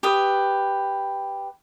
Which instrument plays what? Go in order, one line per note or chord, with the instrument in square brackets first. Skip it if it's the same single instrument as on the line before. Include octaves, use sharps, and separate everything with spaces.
[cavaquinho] G4 B4 D#6